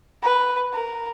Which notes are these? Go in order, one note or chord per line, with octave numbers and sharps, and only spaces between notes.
B4
A#4